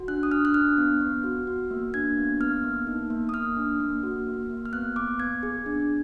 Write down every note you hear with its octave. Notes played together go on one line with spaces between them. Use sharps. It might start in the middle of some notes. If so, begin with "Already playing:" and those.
Already playing: F#4
D4 F#6
D#6
D4 F6
F#6
D4 F6
B3
B3
F#4
F#4
A#3
D4 G#6
B3
B3 F6
A#3
D#4
A#3
D#6
A#3 F6
D4
A#3
F#4
A#3
A#3
F6
B3 F#6
B3 D6
B3 G#6
G#4
D4